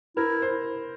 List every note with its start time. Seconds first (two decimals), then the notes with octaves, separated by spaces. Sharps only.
0.17 E4 A#4
0.42 C5